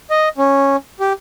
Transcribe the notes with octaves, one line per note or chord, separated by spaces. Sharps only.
D#5
C#4
G4